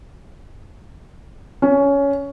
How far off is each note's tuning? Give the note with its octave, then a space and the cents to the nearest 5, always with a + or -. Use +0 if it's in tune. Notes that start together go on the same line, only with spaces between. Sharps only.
C#4 +15